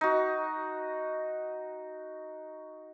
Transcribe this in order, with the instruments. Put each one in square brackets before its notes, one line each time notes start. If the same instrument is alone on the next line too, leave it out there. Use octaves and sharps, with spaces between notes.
[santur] D#4 F#4